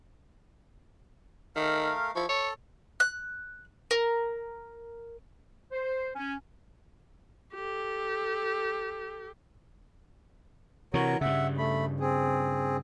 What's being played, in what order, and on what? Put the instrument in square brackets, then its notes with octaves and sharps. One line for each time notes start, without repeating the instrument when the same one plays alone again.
[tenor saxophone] D#3 [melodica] A3 A#4 F5
[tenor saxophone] F3 [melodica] E4 C#6
[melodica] A4 [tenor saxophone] C#5
[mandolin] F#6
A#4
[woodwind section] C5
C#4
[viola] G4 A4
[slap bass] C3 E3 [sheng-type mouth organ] F#4 A#4 C#5
[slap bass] G2 C#3 [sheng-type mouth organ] E5 F#5
[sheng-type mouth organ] A3 B5
C4 G#4